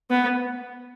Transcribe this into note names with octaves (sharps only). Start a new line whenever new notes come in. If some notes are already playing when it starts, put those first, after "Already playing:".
B3